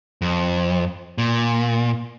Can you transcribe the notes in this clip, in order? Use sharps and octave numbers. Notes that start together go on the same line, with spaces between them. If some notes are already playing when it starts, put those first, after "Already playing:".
F2
A#2